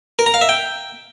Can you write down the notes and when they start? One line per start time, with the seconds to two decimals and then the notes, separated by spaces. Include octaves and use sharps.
0.19 A#4
0.26 A#5
0.34 F5
0.41 E5
0.49 G5